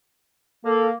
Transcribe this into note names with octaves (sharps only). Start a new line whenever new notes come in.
A#3 A4